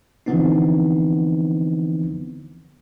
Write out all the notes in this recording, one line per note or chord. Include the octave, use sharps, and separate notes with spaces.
D3 E3 F3 B3 C4 D#4